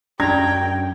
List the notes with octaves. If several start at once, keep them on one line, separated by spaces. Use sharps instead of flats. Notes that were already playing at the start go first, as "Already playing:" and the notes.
F#2 D4 G5 A#5 G#6